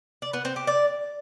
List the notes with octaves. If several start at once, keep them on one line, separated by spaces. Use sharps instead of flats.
D5
B3
C4
G4
D5